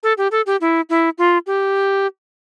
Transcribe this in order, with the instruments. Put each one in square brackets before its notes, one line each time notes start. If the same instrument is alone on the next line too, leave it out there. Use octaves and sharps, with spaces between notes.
[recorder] A4
G4
A4
G4
E4
E4
F4
G4